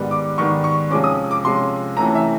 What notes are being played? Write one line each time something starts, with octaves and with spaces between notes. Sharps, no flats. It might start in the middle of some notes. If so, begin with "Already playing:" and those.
Already playing: G#2 D#3 G3 B3
D6
G#2 D#3 G3 B3 C#6
C#6
C3 F3 G#3 C#4 D6
D#6
D6
C3 F3 G#3 C#4 C6
C3 E3 A3 C#4 A#5
E5